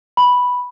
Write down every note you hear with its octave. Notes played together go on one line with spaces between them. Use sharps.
B5